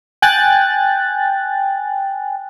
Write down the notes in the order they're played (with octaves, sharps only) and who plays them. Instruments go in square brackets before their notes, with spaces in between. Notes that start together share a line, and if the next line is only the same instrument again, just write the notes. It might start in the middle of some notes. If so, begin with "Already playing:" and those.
[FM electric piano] G5 G#5 F#6 A6